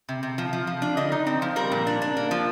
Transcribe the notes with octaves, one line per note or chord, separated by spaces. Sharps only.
C3
C3
F3
F3
F3
D4
D3 D#5
D#4
C4
F3
G3 A#4
A#2
D4
D4
A#3
F3